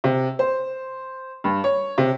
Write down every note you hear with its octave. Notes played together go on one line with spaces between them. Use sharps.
C3
C5
G2
C#5
C3